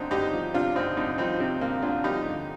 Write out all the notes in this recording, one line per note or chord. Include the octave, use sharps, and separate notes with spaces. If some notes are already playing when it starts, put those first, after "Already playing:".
Already playing: D2 D3 C4 D4 D#4
D2 D#4 G4
F3
C3 D4 F4
D2 C4 D#4
D2 C4 D#4
F3 C4 D#4
C3 C4
D2 A#3
D2 D4 F4
F3 D#4 G4
D3